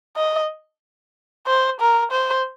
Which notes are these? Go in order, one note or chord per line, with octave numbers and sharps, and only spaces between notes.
D#5
C5
A#4
C5